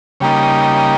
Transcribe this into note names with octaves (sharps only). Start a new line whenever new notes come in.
C#3 G3 A#3 D#4